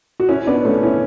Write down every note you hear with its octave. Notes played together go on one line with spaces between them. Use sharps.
F#4
C#4 E4
B3 D4
A3 C#4
C#4 E4